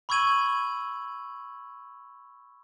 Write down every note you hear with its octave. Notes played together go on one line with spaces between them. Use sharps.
B5 C#6 E6 G#6 D#7 F#7